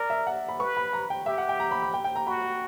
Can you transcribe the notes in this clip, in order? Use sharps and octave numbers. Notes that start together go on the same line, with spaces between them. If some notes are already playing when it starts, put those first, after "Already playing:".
Already playing: A#4 D5
E5
F#5
B5
B4 C#6
B5
A#5
G5
G4 E5
F#5
G5
A#5
B5
B5
G5
G5
A#5
F#4 B5